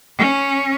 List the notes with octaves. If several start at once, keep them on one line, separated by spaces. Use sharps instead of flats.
C#4